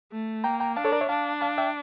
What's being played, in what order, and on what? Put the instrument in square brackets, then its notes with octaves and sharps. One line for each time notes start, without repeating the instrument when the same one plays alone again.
[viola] A3
[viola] A#3 [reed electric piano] G5 A#5
[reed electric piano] G5 A#5
[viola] D4 [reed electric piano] F5 A5
[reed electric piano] A4 C#5
A#4 D5
C#5 E5
[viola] D4 [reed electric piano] F5 A5
[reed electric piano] F5 A5
E5 G5